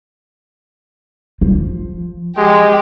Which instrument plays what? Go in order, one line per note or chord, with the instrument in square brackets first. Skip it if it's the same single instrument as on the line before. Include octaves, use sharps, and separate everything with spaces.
[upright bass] F3
[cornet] G#3 [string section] G4